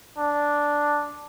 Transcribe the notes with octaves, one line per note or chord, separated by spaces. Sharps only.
D4